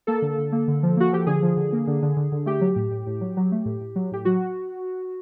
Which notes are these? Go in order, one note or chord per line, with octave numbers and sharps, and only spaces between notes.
A#3 A4
D3
D3
A#3
D3
F3
A#3 F#4
F3 G4
D3 G#4
F3
D3
A#3
D3
D3
D3
D3
A3 G4
F#3
A2
A2
A2
F#3
F#3
A3
A2
A2
F#3
A2 G4
F#3 F#4